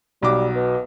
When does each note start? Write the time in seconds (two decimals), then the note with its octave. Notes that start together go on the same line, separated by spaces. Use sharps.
0.23 B1 F#3 G3 D6
0.55 B2